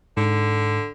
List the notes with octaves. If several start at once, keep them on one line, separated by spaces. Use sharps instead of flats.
G#2 D3